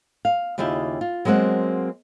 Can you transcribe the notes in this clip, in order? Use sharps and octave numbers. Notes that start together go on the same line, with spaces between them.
F5
D#2 C#3 E4 F4 G4 E5
F4
F#3 G#3 A#3 C4 F#5